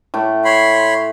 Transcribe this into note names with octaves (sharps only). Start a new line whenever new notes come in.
A2 D6
C#5 B5 C6